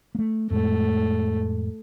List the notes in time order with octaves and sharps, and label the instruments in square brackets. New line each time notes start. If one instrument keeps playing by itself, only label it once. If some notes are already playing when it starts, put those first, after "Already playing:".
[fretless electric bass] A3 A#3
[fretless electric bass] F2 A2 G#3 [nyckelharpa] A3